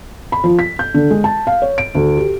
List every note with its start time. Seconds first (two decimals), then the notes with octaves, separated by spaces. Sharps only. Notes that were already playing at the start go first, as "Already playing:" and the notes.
0.32 B5
0.44 F3
0.59 B6
0.79 G6
0.94 D3
1.11 G#3
1.24 A5
1.47 F5
1.62 C#5
1.78 D7
1.95 D2
2.17 G4